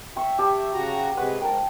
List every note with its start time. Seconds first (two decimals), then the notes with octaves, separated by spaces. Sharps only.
0.16 E5 G5 C#6
0.39 G4 A5
0.73 C#3 F#4 A#5
1.17 C3 G#3 B4 F#5 C#6
1.42 G#2 A#4 G5 A5